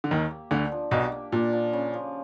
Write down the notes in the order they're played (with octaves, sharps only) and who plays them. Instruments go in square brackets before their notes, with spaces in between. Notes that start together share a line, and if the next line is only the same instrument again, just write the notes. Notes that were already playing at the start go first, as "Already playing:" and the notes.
[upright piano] D3
[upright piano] D#2 D#3 [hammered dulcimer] G4
[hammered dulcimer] A#3
[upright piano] D2 D3 [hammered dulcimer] D4
[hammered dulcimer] F3
[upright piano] B1 B2 [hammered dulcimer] G4
[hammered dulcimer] A#3
[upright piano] A#2 [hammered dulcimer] D4
[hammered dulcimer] F3
C#3
F3